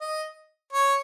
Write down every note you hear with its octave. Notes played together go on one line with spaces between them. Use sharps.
D#5
C#5